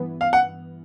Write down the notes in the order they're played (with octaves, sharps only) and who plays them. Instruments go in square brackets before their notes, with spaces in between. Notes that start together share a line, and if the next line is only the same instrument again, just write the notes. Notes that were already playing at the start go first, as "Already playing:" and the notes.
Already playing: [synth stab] G2 E3 B3
[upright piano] F5
F#5